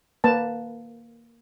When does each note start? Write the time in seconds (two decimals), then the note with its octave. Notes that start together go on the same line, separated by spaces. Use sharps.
0.24 A#3 B4 A5